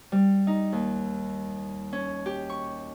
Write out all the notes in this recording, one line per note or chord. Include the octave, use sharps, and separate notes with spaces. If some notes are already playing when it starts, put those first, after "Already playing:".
G3
D#4
D#2
C#4
G4
C#6